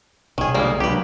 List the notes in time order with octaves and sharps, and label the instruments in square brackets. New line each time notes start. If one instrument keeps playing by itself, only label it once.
[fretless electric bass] C2 B2 [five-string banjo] D#3 G#4
[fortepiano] D2 G#3 [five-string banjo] G3 A#3
[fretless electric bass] C2 C#4 D4 [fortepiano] F#3 A#3 [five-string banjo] G4 B4